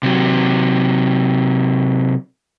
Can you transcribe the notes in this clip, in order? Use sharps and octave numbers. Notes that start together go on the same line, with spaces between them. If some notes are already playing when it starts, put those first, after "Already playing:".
C3 F#3